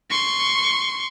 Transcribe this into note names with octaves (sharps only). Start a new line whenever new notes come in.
C6 C#6